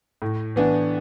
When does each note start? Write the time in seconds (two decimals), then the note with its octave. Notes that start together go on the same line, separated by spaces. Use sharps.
0.22 A2
0.56 E3 B3 D4